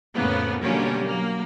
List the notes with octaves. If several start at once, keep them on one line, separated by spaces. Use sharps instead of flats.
F2 A2 C#3 A#3 B3
B2 D3 F#3 G3 A#3 C#4
F#3 A#3